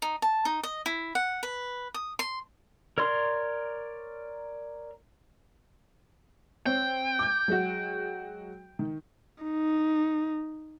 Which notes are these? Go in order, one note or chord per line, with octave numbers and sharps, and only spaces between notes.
D#4
A5
D#4
D#5
E4
F#5
B4
D#6
C6
A#4 C#5 D5 C6
C4 C#5 G5
D6 G6
F#3 G#3 F#4
D#3
D#4